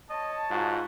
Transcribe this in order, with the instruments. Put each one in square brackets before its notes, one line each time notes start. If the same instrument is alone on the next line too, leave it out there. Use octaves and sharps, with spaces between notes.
[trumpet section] C#5 A5 [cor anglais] D#5
[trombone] G#2 [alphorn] F4 [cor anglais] F#4